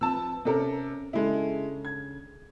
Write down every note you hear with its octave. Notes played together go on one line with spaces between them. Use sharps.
F3 C4 B4 A5 E6
C3 C#4 A4 A#4
C#3 G#3 D4 E4 A4
G#6